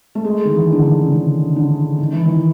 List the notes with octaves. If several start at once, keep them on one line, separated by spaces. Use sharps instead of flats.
A3
G#3
D#3
E3
D3
D#3
C#3
D3
D3
D#3
E3
D#3